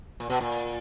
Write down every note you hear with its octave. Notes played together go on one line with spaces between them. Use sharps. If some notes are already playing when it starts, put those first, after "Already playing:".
A#2
B2
A#2